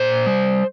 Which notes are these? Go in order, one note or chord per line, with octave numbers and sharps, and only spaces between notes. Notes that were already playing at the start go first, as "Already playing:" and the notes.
Already playing: A#2 C5
G3